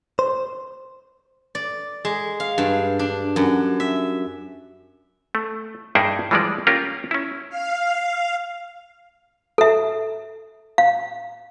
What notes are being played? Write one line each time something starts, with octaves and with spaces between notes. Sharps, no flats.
C5
D5
G#3
F5
G2
D4
F#2
E5
A3
G2 A#3 D#4 G#4 E5 G5
E3 F3 G3 G#3 D5
A#3 C#4 F4 G4 A#4
C#4 E4
F5
A4 E5
F5